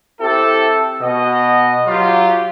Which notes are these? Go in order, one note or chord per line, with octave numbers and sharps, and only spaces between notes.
C4 E4 G4 A4
B2 D#5
F#3 F4 G4